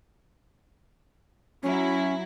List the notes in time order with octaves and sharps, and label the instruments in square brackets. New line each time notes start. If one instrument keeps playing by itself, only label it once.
[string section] F#3 E4 [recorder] C#4